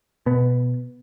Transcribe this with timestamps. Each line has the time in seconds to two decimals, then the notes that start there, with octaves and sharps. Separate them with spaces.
0.26 B2 B3